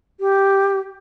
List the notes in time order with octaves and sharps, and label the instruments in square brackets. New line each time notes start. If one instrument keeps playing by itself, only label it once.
[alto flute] G4